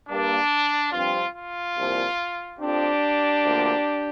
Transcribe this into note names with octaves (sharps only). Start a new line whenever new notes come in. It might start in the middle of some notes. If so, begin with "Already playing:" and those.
G2 G3 A#3 D4
G2 F3 C4 F4
F4
C2 A#2 F3 A#3
F2 F3 C4 D4 G4
D2 D3 F3 A#3